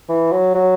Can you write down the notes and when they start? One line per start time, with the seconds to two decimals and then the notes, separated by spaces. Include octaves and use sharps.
0.09 E3
0.32 F#3
0.55 F#3